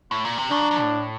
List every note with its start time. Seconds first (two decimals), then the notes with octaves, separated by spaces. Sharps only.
0.11 A2
0.25 A#2
0.38 C3
0.51 D#3 D4
0.61 F#3
0.71 F#3
0.81 A2